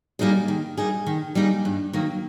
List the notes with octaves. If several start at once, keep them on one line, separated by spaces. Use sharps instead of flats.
G3 A#3 D#4 G#4
D#3
G3 A#3 D#4 G#4
D#3
G3 A#3 D#4 G#4
G2
D#3 F#3 A#3